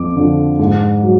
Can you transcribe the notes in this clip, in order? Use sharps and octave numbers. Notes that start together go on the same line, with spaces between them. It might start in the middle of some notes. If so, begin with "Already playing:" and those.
Already playing: F2 D6
D3 F3
G#2
F#3